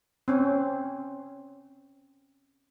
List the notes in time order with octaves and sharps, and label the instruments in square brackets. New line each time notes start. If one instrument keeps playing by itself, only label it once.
[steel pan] C4 C#4